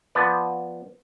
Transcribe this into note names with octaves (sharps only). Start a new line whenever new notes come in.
F3 B3 B4 D5